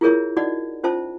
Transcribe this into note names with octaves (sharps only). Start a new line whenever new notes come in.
E4 F4 G#4 A#4 C#5 E5
D#4 F#4 D5 D#5 F#5
C#4 F4 C5 E5 A5